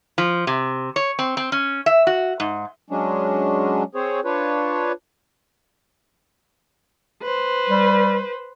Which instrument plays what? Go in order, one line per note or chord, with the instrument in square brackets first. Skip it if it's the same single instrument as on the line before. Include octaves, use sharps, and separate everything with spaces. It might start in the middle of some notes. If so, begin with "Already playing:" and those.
[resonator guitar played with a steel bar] F3
C3
C#5
C4
C4
C#4
E5
F#4
G#2
[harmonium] F#3 G#3 C#4 D4
C4 G#4 C5 C#5
D4 F4 B4 C#5
[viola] B4 C5
[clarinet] G3